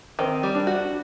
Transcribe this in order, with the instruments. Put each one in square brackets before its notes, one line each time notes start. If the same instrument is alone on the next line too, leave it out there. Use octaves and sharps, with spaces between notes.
[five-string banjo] D#3 [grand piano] C4
[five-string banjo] G3
[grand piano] D4
[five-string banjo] F#4